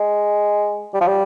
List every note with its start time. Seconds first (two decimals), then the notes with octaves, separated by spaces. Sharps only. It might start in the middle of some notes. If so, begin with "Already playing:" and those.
Already playing: G#3
0.94 G3
1.01 F3
1.08 G3